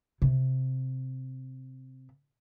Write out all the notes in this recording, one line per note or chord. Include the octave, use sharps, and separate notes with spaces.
C3